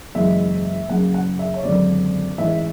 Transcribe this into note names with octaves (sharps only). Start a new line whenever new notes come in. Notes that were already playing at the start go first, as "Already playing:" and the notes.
F#1 F#2 E3 G#3 E5
F#1 F#2 C#3 F#5
F#5
E5
C#5
G#1 F#2 D3 F#3 D5
A1 G#2 E3 E5